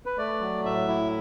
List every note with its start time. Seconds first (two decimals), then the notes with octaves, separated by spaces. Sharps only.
0.06 B4
0.18 A3 D5
0.41 F#3
0.65 A2 E5
0.88 E4